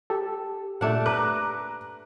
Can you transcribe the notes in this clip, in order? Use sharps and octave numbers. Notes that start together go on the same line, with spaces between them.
G4 A4
A#2 A3 D4 F#5
B4 A#5 D6 F#6